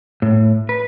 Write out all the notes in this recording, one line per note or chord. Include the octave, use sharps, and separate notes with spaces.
A2
B4